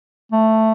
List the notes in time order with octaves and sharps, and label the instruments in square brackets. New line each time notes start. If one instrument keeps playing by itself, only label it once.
[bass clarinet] A3